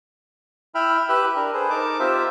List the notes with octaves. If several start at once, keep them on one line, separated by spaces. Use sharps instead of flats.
E4 E5 G5 B5 F6
G4 B4 E5 F#6
D4 A#4
G#4 A4 B4 C5
D#4 A#4 A5 D6
C4 F4 G4 C5 E5